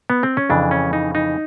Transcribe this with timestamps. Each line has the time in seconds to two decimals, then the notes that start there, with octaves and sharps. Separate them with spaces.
0.10 B3
0.23 C4
0.37 C#4
0.50 F2 C#3 E3 D4
0.71 C#4
0.93 D#4
1.15 D#4